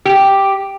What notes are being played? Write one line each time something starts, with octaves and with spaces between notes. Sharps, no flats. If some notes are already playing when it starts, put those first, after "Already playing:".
G4